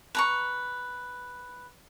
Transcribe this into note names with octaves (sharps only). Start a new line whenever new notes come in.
B4 A#5 C#6